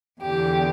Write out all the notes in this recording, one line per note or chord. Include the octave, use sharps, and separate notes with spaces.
E2 D3 G4